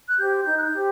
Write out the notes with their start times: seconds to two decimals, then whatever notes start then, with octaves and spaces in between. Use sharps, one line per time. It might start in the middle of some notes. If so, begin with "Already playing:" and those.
0.09 F#6
0.18 G4 C5 G6
0.45 D#4 G6
0.56 F#6
0.63 G6
0.72 G4 C5